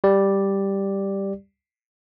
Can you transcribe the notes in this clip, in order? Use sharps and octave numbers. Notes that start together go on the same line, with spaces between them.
G3 G4 D5